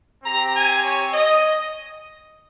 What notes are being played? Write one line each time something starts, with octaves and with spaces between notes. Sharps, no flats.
C4 G4 A#5
G#5
C#5
D#5